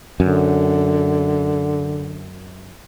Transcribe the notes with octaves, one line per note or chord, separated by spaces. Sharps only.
F#2 D3